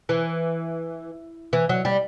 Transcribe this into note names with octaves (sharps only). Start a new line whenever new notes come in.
E3
E3
F#3
G3